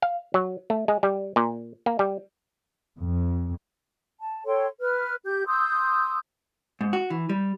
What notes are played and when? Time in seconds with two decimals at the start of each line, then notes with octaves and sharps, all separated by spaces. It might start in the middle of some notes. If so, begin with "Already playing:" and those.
0.02 F5
0.34 F#3
0.70 A3
0.88 G#3
1.03 G3
1.36 A#2
1.86 A#3
1.99 G3
2.98 F2
4.20 A5
4.46 A4 C#5 G5 C6
4.80 B4 F6
5.25 G4 G6
5.47 C6 D#6 E6 G6
6.81 G#2
6.93 F#4
7.10 E3
7.29 G3